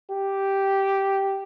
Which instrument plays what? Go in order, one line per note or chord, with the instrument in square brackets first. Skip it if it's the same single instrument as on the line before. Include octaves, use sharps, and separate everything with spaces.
[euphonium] G4